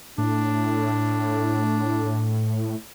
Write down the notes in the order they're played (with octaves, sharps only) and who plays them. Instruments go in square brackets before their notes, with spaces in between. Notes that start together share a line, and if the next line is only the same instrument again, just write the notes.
[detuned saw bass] A2 [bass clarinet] D4